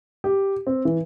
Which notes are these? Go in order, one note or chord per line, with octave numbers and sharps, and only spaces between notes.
G4
C4
E3